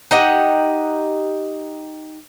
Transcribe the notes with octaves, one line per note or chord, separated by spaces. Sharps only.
D#4 G4 D#5 F#5